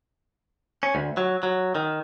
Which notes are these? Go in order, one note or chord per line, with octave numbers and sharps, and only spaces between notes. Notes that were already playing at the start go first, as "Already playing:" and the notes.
C#4
D2
F#3
F#3
D#3